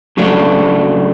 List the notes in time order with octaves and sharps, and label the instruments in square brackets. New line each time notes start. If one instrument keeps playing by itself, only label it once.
[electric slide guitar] C#3 F#3 A3 D4